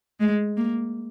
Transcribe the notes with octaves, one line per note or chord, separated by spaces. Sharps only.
G#3
A#3